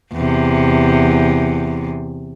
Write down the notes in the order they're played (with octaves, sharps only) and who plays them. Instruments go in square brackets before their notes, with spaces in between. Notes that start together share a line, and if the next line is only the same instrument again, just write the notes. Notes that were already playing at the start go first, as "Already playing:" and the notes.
[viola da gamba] E2 C3